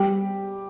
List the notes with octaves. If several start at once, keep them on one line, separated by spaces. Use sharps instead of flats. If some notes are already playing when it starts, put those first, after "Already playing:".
Already playing: G3 G4